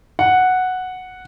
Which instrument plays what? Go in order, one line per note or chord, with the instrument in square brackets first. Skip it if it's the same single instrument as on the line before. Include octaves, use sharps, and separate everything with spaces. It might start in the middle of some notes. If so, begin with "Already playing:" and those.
[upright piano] F#5